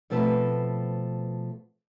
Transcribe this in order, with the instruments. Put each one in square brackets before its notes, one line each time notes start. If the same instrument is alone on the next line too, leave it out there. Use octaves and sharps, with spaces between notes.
[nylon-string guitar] B2 F3 A3 C4 B4